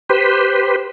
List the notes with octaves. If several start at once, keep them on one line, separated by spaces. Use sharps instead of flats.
G4 B4 C5